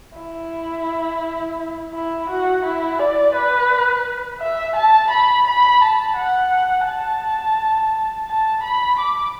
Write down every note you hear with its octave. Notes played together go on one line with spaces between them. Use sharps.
E4
E4
F#4
E4
D5
B4
E5
A5
B5
B5
A5
F#5
A5
A5
B5
D6